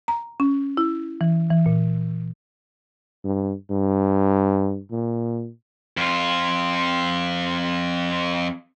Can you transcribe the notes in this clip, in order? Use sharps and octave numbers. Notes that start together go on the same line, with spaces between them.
A#5
C#4
E4
E3
E3
A#2
G2
G2
A#2
F2 F4